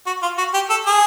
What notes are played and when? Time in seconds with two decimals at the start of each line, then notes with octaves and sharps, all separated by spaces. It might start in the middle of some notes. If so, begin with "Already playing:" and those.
0.06 F#4
0.22 F4
0.38 F#4
0.54 G4
0.70 A4
0.86 G#4